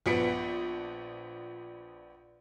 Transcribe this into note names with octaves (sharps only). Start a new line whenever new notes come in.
A#1 F3 B3 B6 C#7 D7